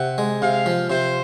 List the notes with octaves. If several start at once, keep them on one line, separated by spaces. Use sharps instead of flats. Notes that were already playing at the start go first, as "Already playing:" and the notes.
Already playing: C3 F#5
G#3
C3 F5
F3
C3 C5